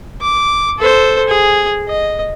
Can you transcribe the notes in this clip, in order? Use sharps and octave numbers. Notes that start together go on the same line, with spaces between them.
D6
A4 C5
G#4
D#5